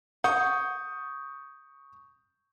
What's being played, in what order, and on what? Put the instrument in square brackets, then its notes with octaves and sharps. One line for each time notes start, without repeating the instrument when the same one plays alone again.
[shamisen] F#5 [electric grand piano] C#6 D#6 G6